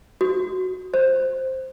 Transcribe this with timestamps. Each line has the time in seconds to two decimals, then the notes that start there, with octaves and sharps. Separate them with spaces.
0.21 F#4
0.94 C5